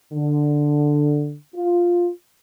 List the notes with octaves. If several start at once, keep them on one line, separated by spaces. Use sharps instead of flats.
D3
F4